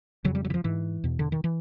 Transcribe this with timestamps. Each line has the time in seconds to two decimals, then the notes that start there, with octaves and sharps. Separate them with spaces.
0.25 F2 C#3 F#3
0.35 G3
0.45 F#3
0.50 E3
0.54 F3
0.64 G#2 E3
1.04 E2 B2
1.19 D3
1.32 D#3
1.44 E3